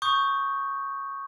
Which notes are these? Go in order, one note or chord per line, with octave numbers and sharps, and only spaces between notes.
C#6 D#6 G6